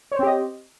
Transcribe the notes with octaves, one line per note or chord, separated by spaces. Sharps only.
C4 G4 C5 C#5 D#5